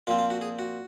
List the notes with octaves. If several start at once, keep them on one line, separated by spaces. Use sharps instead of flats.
A#2 F3 C4 F4
F4
F#4
G#4
F#4